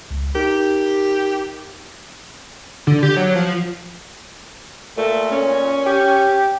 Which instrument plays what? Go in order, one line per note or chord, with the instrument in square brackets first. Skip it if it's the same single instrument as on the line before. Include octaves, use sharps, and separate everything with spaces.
[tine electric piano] C#2
[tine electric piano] D#4 A#4 [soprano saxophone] G4
[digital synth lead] D3
G4
F#3
F3
[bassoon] A#2 [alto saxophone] A3
[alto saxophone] C#4
[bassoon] G4